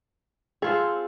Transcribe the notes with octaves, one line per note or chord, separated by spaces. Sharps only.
C4 F4 G#4 A4